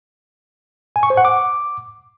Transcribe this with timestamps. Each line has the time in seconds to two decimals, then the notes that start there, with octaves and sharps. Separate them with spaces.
0.96 G#5
1.03 C#6
1.10 C5
1.17 F#5
1.25 D6